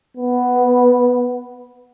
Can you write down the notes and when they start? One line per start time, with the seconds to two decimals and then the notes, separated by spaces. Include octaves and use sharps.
0.17 B3